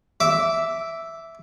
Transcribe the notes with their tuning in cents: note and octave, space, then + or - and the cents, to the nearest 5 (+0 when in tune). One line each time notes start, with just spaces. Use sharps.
E5 +0 D6 -15